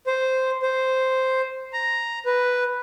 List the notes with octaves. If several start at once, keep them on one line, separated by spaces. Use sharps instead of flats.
C5
C5
A#5
B4